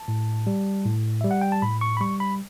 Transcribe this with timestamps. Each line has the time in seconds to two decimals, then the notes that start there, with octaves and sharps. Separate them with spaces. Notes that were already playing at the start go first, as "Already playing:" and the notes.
Already playing: A5
0.08 A2
0.47 G3
0.85 A2
1.21 G3 E5
1.31 F#5
1.41 G5
1.52 A5
1.62 A2 B5
1.81 C#6
1.97 B5
2.01 G3 C#6
2.20 B5